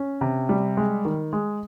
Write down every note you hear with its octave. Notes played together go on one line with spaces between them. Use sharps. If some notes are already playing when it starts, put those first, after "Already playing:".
Already playing: C#4
C3
G3
G#3
D#3
G#3